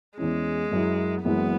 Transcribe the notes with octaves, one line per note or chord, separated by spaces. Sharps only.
E2 E3 G#3 C#4
F#2 F#3 E4
F#1 F#2 E3 G#3 B3